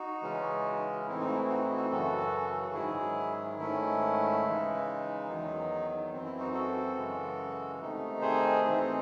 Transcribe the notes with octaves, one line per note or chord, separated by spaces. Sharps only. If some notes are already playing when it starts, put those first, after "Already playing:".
Already playing: D#4 F#4
C#3 E3 G#3 C#4
A2 E3 C4 D#4 E4
D#4
F#4
E4
D#4 F#4
E4
D#4 F#4
F#2 C#3 E3 F#4 A4
F#4
G#2 D#3 F#3 E4 G#4
G#2 D#3 A3 C#4 E4
C#3 E3 G#3 D#4
E2 D#3 F#3 D#4
F#2 E3 C4
E4
D#4 F#4
F#4 A4
F#2 C#3 E3 G#3
C3 D#3 A3 D#4
G#4 C5
G#2 E3 A3 C4 D#4